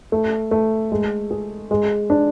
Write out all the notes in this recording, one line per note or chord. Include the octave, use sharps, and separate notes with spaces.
A3
A3
G#3
G#4
G#3
D4